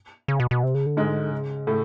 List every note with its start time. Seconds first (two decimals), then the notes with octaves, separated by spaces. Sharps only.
0.28 C#3
0.40 B2
0.51 B2
0.63 C3
0.75 C#3
0.86 D3
0.97 G#2 G#3
1.31 C#3
1.67 A2 A3